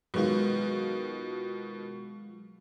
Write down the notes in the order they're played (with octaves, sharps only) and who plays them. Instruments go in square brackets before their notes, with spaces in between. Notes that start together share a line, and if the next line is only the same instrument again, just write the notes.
[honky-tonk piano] B2 D#3 [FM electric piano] F#3 G#3 F4